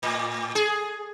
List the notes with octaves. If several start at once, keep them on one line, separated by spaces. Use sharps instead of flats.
A2
G#4